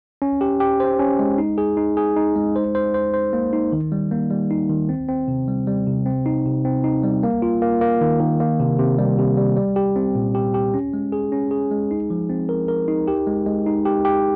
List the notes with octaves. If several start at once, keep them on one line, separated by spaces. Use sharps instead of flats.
C#4
G4
G4
C5
C#4
G#3
D#4
G#4
D#4
G#4
D#4
G#3
C5
C5
C5
C5
A#3
D#4
D#3
G3
A#3
G3
D#4
D#3
C4
C4
C3
G3
G3
C3
C4
D#4
C3
C4
D#4
G3
A#3
F4
A#3
A#3
D#3
D#3
A#3
C3
C3
G3
C3
G3
G3
G4
C4
A#2
G4
G4
C#4
G#3
G#4
C#4
G#4
G#3
D#4
F3
C4
A#4
A#4
D#4
G4
G#3
G#3
D#4
G4
G4